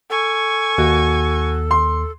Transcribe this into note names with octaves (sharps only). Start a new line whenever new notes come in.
A4 G#5 C#6
D#2 F#4
C6